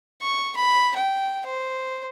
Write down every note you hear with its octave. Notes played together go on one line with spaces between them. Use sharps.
C#6
B5
G5
C5